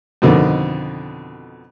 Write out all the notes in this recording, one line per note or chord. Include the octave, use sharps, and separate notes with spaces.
F2 B2 D3 D#3